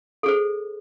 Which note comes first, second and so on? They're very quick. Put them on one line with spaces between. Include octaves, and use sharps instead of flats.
A4 G#4 C5